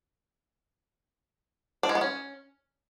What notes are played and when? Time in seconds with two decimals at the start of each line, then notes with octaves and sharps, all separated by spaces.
1.83 D4
1.89 G#3
1.95 B3
2.01 C#4